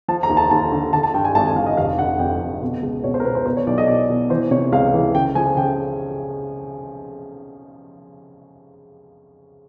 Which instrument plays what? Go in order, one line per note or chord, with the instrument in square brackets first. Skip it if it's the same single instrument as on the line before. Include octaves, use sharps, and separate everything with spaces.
[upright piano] F3 A5
A#5
D#2
A5
D#2 A5
D3
D3 A5
A5
G2 G5
G#5
G#1 A5
G#5
G#1 F5
D#5
F1 F5
D3 F#5
F2 G5
F2
B2
C#2
B2 C#5
C5
A#4
B2 B4
C5
B2 C5
C#5
B1 D5
D#5
B2 D5
B2
E3 C5
C3 C#5
C#2 F5
E3
C#3 G5
F3 G#5
C#3 G5